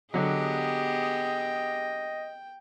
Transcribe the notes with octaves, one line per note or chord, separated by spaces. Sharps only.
D3 F#3 B3 G4 G#4 D#5 G5